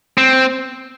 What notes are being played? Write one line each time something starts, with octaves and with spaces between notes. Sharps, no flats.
C4